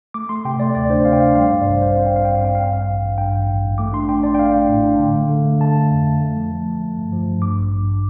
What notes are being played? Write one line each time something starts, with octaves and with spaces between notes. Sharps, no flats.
A3 D6
A3 C6
C3 G5
A3 D5
D2 D5
D4 C5
C3 F5
G5
D4 F5
G3 F5
G2 D5
A1 C5
A1 C5
C4 F5
G5
A1 F5
G2 G5
F5
C4 G5
G2 F5
G5
A1 F5
A1
A1
G2 G5
A1
A1
A1
A3 D6
D4 C6
D4 G5
D4 D5
G5
A3 F5
D4
A2
D4
D3
A3
D3
A3
D3 A5
D3
F2
A3
A3
F3
A3
F3
A3
G2
F3
G2
G2 D6
A1
G2